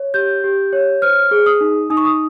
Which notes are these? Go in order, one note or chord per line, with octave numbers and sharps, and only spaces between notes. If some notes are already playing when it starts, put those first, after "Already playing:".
Already playing: C#5
G4 G6
G4
C#5
C5 F6
G#4
D#6
D#4
D#4 D#6
C#6
D#6